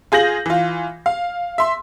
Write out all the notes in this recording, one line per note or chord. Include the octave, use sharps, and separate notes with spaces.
F4 G#4 G6 A#6 F#7
E3 F4
F5
E5 C6